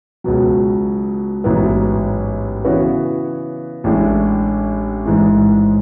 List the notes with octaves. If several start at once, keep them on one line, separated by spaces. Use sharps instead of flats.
C#2 B2 F#3
A1 G#2 F#3 B3 E4
C#3 E3 B3 F#4 C#5
A1 A2 G#3 D4
A1 G#2 E3 G#3